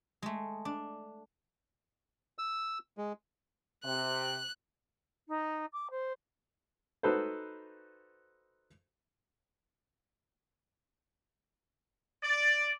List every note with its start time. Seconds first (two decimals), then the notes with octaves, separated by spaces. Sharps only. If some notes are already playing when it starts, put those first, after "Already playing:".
0.22 G#3 A3
0.65 D4
2.38 E6
2.98 G#3
3.84 C3 F#6
5.28 D#4
5.73 D6
5.90 C5
7.03 D#4 F#4 A4 B4 C5
12.24 D5